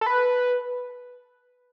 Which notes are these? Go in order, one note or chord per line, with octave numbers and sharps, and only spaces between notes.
A4
B4